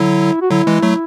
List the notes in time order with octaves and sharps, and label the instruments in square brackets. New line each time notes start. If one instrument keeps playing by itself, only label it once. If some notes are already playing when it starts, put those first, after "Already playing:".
Already playing: [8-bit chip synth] D3 F#3 [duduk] E4
[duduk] F#4
[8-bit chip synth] D3 F#3 [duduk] E4
[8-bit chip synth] E3 G#3
F#3 A3